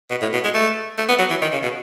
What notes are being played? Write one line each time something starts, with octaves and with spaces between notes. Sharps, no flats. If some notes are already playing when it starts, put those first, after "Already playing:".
B2
A2
B2
G#3
A3
A3
B3
F#3
E3
D#3
C#3
B2